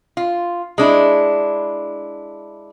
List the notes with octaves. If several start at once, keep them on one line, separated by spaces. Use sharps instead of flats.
F4
G#3 D4 E4